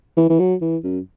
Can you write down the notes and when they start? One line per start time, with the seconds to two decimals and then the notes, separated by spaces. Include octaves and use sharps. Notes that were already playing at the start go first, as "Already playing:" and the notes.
0.17 E3
0.29 E3
0.40 F#3
0.61 E3
0.84 F#2